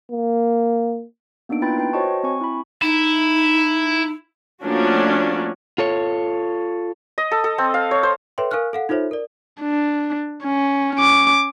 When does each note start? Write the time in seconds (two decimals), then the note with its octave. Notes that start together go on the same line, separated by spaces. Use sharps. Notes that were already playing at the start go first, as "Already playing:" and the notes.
0.11 A#3
1.49 A#3 B3 D4 D#4 D7
1.62 E4 F4 B4 G5 B5 A6
1.78 B4 G5
1.93 F#4 C5 C#5 D#5 A5 C#6
2.23 C4 G#5 C#6
2.41 E4 B5
2.82 D#4 E4
4.63 F3 A3 A#3 C#4 D4 F#4
5.78 F4 A4 C#5
7.18 D#5
7.31 A4
7.44 A4
7.58 C4
7.74 F5
7.91 C#5
8.03 C5
8.38 A4 B4 C#5 E5 G5 C6
8.51 A#4 F5 G#5 C#6 F6 F#6
8.73 A4 F5 F#5
8.89 D#4 F4 A4 C5 C#5 E5
9.11 A#4 D5
9.61 D4
10.44 C#4
10.96 C#4 D6